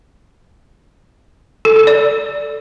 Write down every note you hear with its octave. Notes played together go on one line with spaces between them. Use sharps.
A4
A4
D5